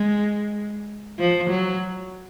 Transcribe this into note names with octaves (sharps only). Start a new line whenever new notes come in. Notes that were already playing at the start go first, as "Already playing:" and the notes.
Already playing: G#3
F3
F#3